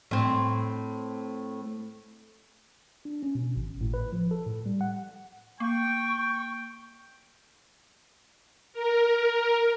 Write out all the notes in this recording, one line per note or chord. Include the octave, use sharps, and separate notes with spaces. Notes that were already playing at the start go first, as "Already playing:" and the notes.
A2 C4
D4
C#4
B2
G#1
A2
B4
F3
A4
A2
G3
F#5
A#3 G5 C#6
A#4